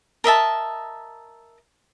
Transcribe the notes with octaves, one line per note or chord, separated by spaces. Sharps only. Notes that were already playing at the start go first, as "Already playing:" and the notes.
A#4 D#5 E5 A5